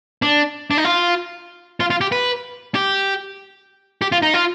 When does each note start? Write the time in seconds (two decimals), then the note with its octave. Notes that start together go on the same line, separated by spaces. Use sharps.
0.22 D4
0.71 D4
0.78 D#4
0.85 F4
1.80 F4
1.90 F4
2.01 G4
2.12 B4
2.75 G4
4.02 G4
4.12 F4
4.22 D#4
4.34 F4